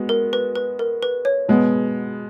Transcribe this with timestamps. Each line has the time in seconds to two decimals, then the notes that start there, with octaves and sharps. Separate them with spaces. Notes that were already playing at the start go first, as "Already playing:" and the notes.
Already playing: G#3 B3 F#4
0.09 A#4
0.33 B4
0.56 B4
0.79 A#4
1.03 B4
1.25 C#5
1.48 B2 G#3 B3